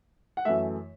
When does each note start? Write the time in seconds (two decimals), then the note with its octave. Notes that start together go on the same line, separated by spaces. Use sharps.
0.37 F#5
0.45 F#2 E3 A3 E5